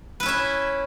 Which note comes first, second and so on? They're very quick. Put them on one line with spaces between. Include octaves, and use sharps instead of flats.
B4 E4 C#4 E5